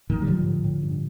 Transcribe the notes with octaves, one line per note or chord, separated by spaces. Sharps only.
A2 D#3
G3
A2 D3 F3
A2
A2
G2